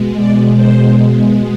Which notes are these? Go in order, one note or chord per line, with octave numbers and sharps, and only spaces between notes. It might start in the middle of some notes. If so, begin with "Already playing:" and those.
Already playing: B2 G#3
D5
C5